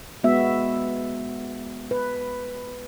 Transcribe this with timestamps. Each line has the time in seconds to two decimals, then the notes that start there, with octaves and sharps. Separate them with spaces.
0.23 G#3 B3 F#4 E5
1.91 B4